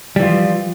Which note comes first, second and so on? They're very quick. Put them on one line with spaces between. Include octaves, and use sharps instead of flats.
G3 E3 F4 F3